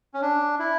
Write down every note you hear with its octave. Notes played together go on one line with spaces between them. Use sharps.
C#4
D4
E4